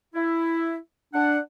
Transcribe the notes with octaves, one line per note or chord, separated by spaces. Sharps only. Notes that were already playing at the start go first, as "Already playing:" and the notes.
E4
D4 F#5